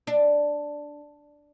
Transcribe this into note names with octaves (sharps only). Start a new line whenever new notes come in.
D4